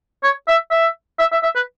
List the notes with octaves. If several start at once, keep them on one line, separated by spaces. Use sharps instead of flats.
C#5
E5
E5
E5
E5
E5
B4